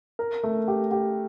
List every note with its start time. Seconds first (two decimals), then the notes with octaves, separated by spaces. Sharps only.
0.19 A#4
0.43 A3
0.68 G4
0.91 G4